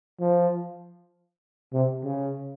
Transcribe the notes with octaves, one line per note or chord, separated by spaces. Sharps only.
F3
C3
C#3